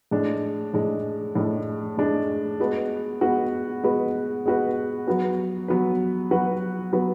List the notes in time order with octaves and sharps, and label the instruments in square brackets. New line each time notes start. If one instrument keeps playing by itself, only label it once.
[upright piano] A2 G#3 D4
A2 G#3 D4
A2 G#3 D4
A2 G#3 D4
G#3 B3 F#4 B4
G#3 B3 F#4 B4
G#3 B3 F#4 B4
G#3 B3 F#4 B4
F#3 B3 F#4 B4
F#3 B3 F#4 B4
F#3 B3 F#4 B4
F#3 B3 F#4 B4